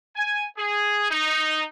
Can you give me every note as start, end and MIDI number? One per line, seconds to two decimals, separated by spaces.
0.16 0.45 80
0.57 1.11 68
1.11 1.63 63